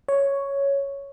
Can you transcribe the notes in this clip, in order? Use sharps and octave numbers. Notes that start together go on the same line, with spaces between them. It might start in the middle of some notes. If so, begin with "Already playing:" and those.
C#5